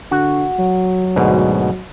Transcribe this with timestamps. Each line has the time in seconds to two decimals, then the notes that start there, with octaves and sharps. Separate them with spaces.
0.11 D3 F#4
0.58 F#3
1.16 D2 G#2 B2